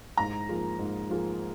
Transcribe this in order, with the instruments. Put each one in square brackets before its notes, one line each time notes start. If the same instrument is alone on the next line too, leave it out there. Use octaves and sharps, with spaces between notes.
[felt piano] G#2 [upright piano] A#5
[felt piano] F3 A#3 F4 G#4
G#2
F3 A#3 F4 G#4